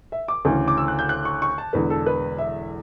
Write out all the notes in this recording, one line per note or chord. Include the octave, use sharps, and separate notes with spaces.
E5
D6
D2 C#3 E3
D6
E6
F#6
G6
F#6
C#6
C#6
A5
E1 E2 D3 B4
A4
B4
E5